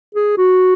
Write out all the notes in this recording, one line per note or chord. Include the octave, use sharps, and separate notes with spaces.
G#4
F#4